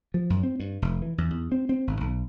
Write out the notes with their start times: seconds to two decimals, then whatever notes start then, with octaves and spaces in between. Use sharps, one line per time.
0.14 F3
0.30 F#2
0.43 C4
0.60 G2
0.82 F1
1.02 E3
1.18 E2
1.30 E2
1.52 C4
1.69 C4
1.87 G#1
2.01 B1